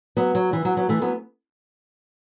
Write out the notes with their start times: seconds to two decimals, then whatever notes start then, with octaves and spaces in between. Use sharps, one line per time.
0.17 F#3 B3
0.35 F#3
0.53 E3
0.65 F#3
0.77 F#3 B3
0.89 E3 A3
1.01 F#3 B3